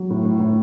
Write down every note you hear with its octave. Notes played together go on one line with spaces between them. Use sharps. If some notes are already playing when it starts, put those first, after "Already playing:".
Already playing: F#3
A2
A2
A2